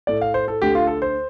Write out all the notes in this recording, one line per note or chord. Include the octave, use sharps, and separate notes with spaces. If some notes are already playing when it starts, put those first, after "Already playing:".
A2 A3 D5
F5
C5
A4
D2 D3 A3 G4
F4
A4
C5